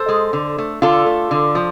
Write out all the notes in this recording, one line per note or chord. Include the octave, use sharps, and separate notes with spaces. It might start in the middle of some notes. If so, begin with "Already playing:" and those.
Already playing: A4 C5
G#3
D3
A3
D3 F4 A4
A3
D3
F3